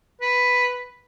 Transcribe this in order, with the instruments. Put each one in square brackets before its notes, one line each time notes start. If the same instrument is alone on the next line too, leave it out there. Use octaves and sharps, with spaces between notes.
[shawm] B4